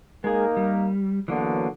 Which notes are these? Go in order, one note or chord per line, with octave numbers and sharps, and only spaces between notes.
G#3 A#3 D#4 G#4 A#4
G3
D3 E3 F#3 A#3 B3